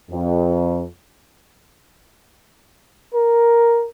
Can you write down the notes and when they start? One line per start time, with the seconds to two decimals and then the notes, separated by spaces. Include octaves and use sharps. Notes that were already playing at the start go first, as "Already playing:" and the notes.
0.10 F2
3.14 A#4